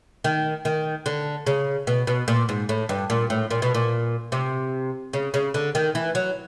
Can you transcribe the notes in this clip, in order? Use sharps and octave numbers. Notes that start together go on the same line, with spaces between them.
D#3
D#3
D3
C#3
B2
B2
A#2
G#2
A2
G2
A#2
A2
A#2
B2
A#2
C3
C#3
C#3
D3
D#3
E3
F#3